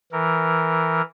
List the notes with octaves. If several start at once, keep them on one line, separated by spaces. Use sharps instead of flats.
E3 A#4